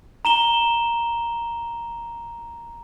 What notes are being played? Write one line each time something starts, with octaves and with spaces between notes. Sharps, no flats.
A#5 E7 G7